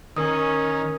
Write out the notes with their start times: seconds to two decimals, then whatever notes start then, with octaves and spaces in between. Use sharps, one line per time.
0.17 D#3 C#4 A#4 D#6